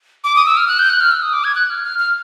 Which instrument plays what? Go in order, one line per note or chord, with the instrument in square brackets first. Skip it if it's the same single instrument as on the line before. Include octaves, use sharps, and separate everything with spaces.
[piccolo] D6
D#6
E6
F6
F#6
G6
F#6
F6
E6
D#6
D6
G#6
F#6
F6
F6
F6